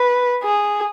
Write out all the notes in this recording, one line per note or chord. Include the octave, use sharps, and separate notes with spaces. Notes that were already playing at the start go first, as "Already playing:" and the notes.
Already playing: B4
G#4